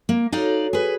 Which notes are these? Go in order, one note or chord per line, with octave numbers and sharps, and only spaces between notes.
A#3
D#4 F#4 A4 C#5 D5 F5
G#4 B4